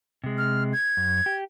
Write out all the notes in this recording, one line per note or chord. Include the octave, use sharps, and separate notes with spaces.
C3 G#3
F6
G#6
F#2
G4